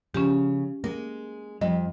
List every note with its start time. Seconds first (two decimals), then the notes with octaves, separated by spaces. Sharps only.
0.14 C#3 F3 C#4 G4
0.84 G#3 A#3 A#4
1.61 F2 G3 D#5